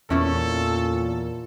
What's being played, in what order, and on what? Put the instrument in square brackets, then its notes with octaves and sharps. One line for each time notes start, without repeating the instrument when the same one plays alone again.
[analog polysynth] E2 [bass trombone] A#2 [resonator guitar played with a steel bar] C#4 E4 C#5 [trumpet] A4